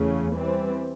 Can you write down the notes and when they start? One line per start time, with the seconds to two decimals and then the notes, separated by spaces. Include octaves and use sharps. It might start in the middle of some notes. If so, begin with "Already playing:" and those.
Already playing: E2 C#3 E3 A3
0.35 E3 G3 C4